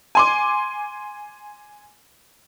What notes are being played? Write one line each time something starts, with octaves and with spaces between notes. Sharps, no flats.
G#5 C6 D6